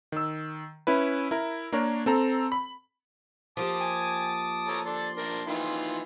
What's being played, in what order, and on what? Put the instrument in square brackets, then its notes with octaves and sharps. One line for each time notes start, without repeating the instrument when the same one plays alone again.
[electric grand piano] D#3 E6
C#4 E4 B4
E4 A#4
A#3 D4 A#4 C#5
C4 A4 A#5
B5
[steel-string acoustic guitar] F3 A#3 G4 [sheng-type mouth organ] A5 D6 D#6
[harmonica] G#5
A4 C#5 A#5
[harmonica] A4 D5 [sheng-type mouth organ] C6
[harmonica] D4 A#4
D#3 E3 F4